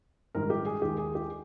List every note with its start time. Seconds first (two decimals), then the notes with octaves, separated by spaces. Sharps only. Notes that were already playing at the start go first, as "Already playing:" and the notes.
0.35 A#1 G#2 D#3 G3 A#4
0.50 G4
0.66 G#4
0.82 D#2 D#3 G#3 G4
0.98 G#4
1.15 G4